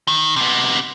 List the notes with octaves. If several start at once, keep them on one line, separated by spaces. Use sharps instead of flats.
D#3
C3 B3